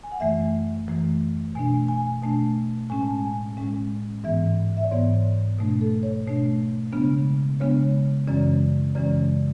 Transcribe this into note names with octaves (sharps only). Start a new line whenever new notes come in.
G#5
F#5
F#2 E3 A3 E5
F#2 E3 A3
B2 A3 D4 G#5
G#5
B2 A3 D4 A5
A2 G#3 C#4 G#5
A5
G#5
A2 G#3 C#4
G#2 E3 B3 E5
E5
D5
G#2 E3 B3 C#5
B2 A3 D4
A4
C#5
B2 A3 D4
C#3 G#3 B3 D4
C#3 G#3 B3 D4 C#5
F#2 C#3 E3 G#3 C#4 D5
F#2 C#3 E3 G#3 C#4 D5